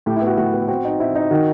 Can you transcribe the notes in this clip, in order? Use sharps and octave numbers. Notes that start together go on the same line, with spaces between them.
A2 G4
E4
B3 F#4
A2 F#4
B3
C4 F#4
D#4
C4 E4
D#4
D#3 F#4